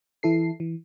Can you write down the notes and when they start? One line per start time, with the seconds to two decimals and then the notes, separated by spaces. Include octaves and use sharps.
0.23 E3 E4 A4 C7
0.60 E3